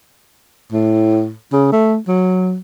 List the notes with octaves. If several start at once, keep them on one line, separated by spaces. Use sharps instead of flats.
A2
C#3
A3
F#3